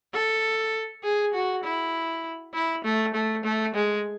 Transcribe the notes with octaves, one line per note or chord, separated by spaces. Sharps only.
A4
G#4
F#4
E4
E4
A3
A3
A3
G#3